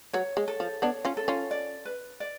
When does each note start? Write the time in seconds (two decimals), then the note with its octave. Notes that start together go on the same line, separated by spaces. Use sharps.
0.13 F#3 C#5
0.37 G#3
0.48 A4
0.60 F3
0.82 B3 D4 C#5
1.05 C#4 F4
1.17 A4
1.28 C#4 F4
1.51 D5
1.85 B4
2.20 D5